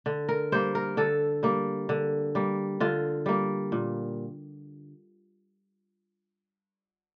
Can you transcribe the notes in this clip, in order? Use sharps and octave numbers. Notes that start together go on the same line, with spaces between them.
D3
A#4
G3 A#3 C5
A#4
D3 A4
G3 A#3
D3
G3 A#3
D3 F4
G3 A#3
A#2